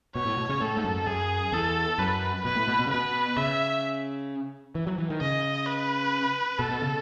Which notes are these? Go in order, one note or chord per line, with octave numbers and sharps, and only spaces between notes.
B2 C#5
A2
B2
C#3
A2 A4
G#2
F#2
F#2 G#4
E2 A4
F#2 B4
B2 B4
A2
B2
B2
C#3
B2 B4
C#3 E5
E3
F#3
E3
D#3
C#3 D#5
B4
B2 A4
B2
C#3